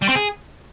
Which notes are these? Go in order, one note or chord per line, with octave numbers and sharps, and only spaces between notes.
G3
C4
G#4